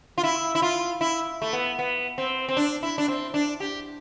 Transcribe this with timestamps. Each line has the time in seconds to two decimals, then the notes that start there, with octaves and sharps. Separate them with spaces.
0.18 F4
0.23 E4
0.55 E4
0.62 F4
1.01 E4
1.42 A3
1.53 B3
1.79 B3
2.18 C4
2.49 C4
2.57 D4
2.83 E4
2.98 D4
3.08 C4
3.34 D4
3.60 G4